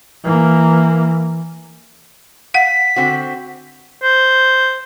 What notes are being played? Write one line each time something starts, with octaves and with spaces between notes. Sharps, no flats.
E3 A#3
F5 F#5 B6
D3 C4 F#4
C5